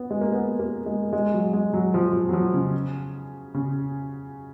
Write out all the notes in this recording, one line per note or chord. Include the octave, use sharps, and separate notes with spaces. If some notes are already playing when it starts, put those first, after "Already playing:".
Already playing: B3
G#3
A#3
B3
A#3
G#3
G#3
F#3
G#3
F#3
F3
F3
F#3
F3
C#3
C#3